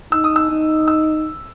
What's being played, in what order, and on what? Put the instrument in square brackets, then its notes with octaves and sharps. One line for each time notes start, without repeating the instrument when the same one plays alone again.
[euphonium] D#4 [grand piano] E6
[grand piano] D#6
E6
[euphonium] D#4
[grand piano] E6